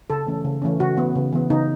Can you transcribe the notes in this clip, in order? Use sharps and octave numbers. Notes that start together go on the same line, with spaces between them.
C#3 A4
E3 A3 C#4
C#3
E3 A3 C#4
C#3 F#4
E3 B3
C#3
E3 B3
C#3 D#4